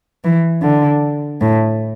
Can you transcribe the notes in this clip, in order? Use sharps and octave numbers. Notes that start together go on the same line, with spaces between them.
E3
D3
A2